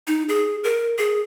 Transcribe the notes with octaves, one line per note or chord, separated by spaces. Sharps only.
D#4
G#4
A#4
G#4